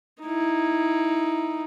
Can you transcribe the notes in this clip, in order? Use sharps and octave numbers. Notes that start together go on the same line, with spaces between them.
D#4 E4